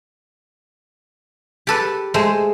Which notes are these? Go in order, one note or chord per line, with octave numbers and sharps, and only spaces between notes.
G4 A4 B4
G#3 A3 C5